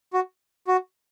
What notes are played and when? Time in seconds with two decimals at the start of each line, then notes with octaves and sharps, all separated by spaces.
0.13 F#4
0.67 F#4